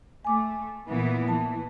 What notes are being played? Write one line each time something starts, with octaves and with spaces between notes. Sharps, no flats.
A3 G#5 D6
A#2 E3 B3
E3 A5